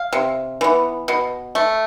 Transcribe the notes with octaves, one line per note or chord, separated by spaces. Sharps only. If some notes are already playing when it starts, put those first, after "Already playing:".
Already playing: F5
C3
E3 B3
B2
A3